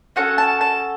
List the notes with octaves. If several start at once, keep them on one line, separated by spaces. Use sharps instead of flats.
C#4 F#4 A4 F#5
A5
A5